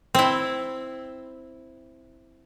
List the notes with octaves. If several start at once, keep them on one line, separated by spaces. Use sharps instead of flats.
C4 E4